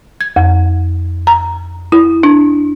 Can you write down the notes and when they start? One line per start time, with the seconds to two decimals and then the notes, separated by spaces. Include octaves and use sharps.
0.21 G#6
0.36 F2
1.27 A#5
1.92 E4
2.23 D4